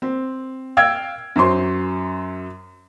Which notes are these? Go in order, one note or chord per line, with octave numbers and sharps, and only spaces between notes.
C4
F5 G5 E6 G#6
F#2 F#3 C5 C6